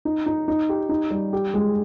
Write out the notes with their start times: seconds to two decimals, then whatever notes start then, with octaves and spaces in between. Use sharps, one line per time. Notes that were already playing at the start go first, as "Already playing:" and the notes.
0.05 D#4
0.26 D#4
0.48 D#4
0.69 G4
0.89 D#4
1.11 G3
1.33 G4
1.54 G#3